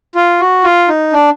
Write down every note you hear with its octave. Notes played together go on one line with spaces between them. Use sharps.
F4
F#4
F4
D#4
D4